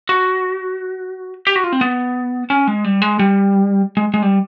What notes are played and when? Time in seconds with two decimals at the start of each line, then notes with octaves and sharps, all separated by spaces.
0.09 F#4
1.47 G4
1.56 F#4
1.64 F4
1.72 C4
1.81 B3
2.50 C#4
2.67 G#3
2.85 G3
3.02 G#3
3.19 G3
3.97 G#3
4.14 G#3
4.22 G3